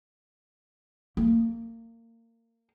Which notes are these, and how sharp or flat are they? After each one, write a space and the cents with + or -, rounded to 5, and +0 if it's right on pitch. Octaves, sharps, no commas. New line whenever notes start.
A#3 -30